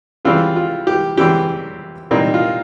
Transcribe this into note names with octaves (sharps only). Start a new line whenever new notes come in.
C#3 E3 G3 C4 F4
F4
G4
C#3 E3 G3 C4 G4
A#2 G3 C4 D#4
F4